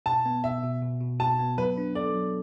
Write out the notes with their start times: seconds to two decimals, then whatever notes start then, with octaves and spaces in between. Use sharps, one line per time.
0.06 B2 A5
0.26 B3
0.44 B2 E5
0.63 B2
0.82 B2
1.01 B2
1.20 F#4 A5
1.39 B3
1.58 F#3 B4
1.78 D4
1.95 A4 D5
2.14 F#3